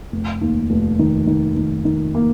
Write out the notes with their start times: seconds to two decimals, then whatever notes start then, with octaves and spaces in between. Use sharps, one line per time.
0.12 F1
0.41 D#2
0.70 F1
0.99 D#3
1.27 D#3
1.56 D#3
1.85 D#3
2.15 A#3